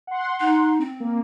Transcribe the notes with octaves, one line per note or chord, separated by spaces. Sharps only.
F#5 C6
D#4
C4
A#3